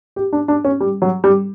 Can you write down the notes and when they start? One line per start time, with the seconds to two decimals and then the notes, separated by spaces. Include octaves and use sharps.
0.16 G4
0.33 D4
0.48 D4
0.64 C#4
0.80 G3
1.02 F#3
1.24 G3